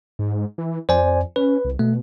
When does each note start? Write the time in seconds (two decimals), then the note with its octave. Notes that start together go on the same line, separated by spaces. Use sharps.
0.19 G#2
0.58 E3
0.89 F2 C5 D5 G#5
1.36 C#4 B4
1.65 C2
1.79 B2 A3